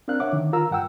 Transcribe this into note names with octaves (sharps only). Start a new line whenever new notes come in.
C4 D4 A#4 F5 F#6
C#5 E5 F#5 D6
D3 D#3
F4 A#4 F5 A#5 E6
G2 F#5 G5 E6